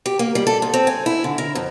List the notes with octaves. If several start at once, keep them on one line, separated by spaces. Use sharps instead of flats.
G4
A#3
G3
A4
G#2
C4
G#5
E4
D3
A#4
F2